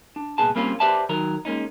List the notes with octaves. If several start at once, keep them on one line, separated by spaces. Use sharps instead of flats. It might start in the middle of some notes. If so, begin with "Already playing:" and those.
D4
C2 A#2 B3 G#4 A5
G3 A#3 C4 C#4 F4
G4 B4 C5 D5 E5 A5
D#3 F#3 A#4
G#3 A#3 C#4 D#4